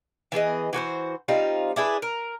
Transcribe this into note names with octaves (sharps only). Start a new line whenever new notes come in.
E3 B3 G#4 D#5
E3 F#4 B4 C5
G3 C4 D#4 F4
D4 E4 G#4 B4
A#4